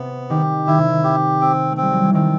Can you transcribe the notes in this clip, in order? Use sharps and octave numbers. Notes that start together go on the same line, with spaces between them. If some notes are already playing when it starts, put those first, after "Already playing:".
Already playing: C3 B3
D#3 G4
D#3 E4
C3
D#3
G4
C4
A3
C4
G3
F#3
E3
D#3 C4